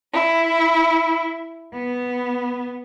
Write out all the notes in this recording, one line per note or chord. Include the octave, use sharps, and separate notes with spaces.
E4
B3